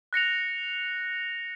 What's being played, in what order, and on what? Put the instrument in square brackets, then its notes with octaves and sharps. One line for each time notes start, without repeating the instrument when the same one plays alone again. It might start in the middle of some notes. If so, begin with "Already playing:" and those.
[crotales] F#6 A#6 C#7 F7